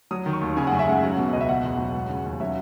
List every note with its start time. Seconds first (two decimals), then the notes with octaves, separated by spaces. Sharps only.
0.11 F#3 D#6
0.26 D#3
0.33 C#6
0.41 D#2
0.57 C#3 G#5
0.67 F#2 F#5
0.79 E5
0.87 G#3 F#5
1.03 F#3
1.18 B2
1.33 C#2 D#5
1.41 E5
1.48 B2 F#5
1.64 E2
1.78 F#3
1.94 G#3
2.10 C#3
2.25 D#2
2.40 F#3 E5